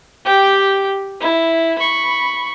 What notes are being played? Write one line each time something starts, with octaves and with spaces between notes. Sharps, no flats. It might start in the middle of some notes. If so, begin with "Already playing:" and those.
G4 G5
E4
B5 C#6